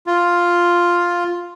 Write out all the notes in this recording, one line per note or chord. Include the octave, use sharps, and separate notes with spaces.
F4